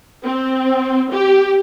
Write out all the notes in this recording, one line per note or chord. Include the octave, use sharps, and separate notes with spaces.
C4
G4